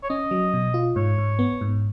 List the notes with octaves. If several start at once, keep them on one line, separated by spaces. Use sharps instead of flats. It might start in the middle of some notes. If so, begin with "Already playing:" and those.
C#5
C#4 D#5
F#3
B2
F4
G#2 C#5
G#2
B3
G#2